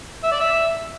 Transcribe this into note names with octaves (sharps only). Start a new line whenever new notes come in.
E5
D5
E5